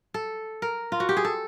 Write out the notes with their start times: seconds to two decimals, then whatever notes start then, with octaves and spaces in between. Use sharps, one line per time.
0.14 A4
0.62 A#4
0.92 F4
1.00 F#4
1.09 G4
1.17 G#4
1.25 A4